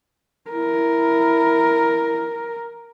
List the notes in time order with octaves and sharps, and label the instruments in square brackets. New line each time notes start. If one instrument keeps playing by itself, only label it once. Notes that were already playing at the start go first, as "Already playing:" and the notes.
[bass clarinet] E4 [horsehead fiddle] A#4